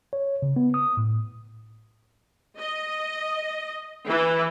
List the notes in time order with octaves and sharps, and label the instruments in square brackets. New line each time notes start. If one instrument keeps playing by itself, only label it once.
[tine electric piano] C#5
C#3
B3
D#6
A2
[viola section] D#5
E3